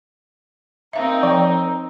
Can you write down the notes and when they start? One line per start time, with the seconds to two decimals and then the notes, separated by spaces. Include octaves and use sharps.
0.93 C4 D#4 A#4 E5 F5
1.23 F3 D5 G5